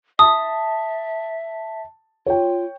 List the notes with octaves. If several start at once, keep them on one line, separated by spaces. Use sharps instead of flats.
E5 A5 D#6
F4 C#5 G5